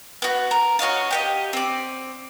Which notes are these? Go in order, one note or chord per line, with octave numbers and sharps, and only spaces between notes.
B3 F#4
A#4
F#4 C#5 D#5 F5
G4 C#5 D#5
C4 D5